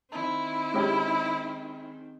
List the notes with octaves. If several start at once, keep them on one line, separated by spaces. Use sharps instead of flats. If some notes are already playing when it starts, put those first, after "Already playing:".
D#3 C4 E4
G#3 C#4 G4